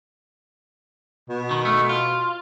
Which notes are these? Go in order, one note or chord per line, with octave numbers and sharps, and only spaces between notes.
B2
D#3
D#3 A3
F4